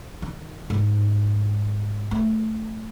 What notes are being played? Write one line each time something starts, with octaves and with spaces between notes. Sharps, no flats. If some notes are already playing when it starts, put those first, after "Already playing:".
D#3
G#2
A3